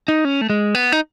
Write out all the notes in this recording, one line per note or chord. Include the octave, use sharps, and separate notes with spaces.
D#4
C#4
A3
G#3
B3
D#4